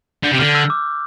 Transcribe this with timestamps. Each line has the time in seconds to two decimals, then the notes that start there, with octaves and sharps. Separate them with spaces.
0.24 D3 G6
0.32 C3
0.39 D3 F6
0.55 E6
0.70 D6